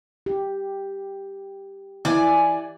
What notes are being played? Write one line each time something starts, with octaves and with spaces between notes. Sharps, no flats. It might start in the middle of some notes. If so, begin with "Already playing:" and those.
G4
E3 D5 G#5